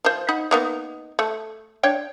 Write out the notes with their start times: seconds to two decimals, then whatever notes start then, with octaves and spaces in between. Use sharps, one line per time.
0.05 F3 C5
0.29 D#4 F#5 B5
0.51 A#3 B3 D#4
1.19 A3
1.83 D4 C#5 G5